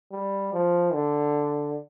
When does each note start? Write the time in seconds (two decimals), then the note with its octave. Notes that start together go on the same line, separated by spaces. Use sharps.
0.12 G3
0.53 F3
0.93 D3